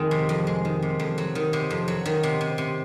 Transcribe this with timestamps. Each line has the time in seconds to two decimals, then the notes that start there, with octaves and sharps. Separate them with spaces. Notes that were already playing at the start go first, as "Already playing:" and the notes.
Already playing: F2 D#3 G#3
0.11 C3
0.29 F2
0.47 G#3
0.65 D#3
0.82 C3
1.00 F2
1.18 F#3
1.35 D#3
1.53 C3
1.71 F2
1.88 F#3
2.06 D#3
2.23 C3
2.41 C3
2.58 C3